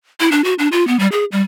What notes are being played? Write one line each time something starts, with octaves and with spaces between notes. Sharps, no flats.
E4
D4
F#4
D4
F4
B3
G3
G#4
G3